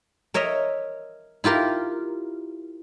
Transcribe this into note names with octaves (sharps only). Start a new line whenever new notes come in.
A#4 C#5 D#5 E5
E4 F4 G4 A#4